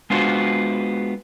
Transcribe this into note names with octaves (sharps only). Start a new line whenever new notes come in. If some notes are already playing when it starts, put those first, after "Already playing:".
G#3 B3 D4 F4 F#4 C5